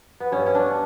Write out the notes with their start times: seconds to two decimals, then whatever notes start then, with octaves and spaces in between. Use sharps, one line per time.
0.20 B3
0.32 G2 C#4
0.46 C#4
0.55 D4